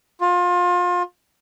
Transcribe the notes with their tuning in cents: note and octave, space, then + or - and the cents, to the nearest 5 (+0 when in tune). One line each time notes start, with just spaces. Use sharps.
F4 +30